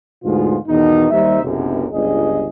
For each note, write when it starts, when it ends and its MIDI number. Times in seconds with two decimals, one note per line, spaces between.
0.24 0.57 38
0.24 0.57 44
0.24 0.57 47
0.24 0.57 56
0.24 0.57 65
0.68 1.06 40
0.68 1.06 47
0.68 1.06 51
0.68 1.06 63
1.10 1.42 39
1.10 1.42 55
1.10 1.42 63
1.10 1.42 72
1.10 1.42 76
1.43 1.85 30
1.43 1.85 35
1.43 1.85 42
1.43 1.85 48
1.92 2.46 31
1.92 2.46 37
1.92 2.46 68
1.92 2.46 75